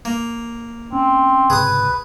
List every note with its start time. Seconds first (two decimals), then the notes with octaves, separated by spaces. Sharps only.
0.05 A#3
0.93 C4 C#4
1.50 C#2 G#2 C3 G#4 B4 D#6